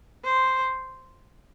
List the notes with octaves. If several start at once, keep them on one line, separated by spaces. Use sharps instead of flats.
C5